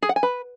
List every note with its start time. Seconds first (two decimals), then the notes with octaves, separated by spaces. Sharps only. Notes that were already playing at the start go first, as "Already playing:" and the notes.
0.03 G#4
0.09 F#5
0.16 G#5
0.23 B4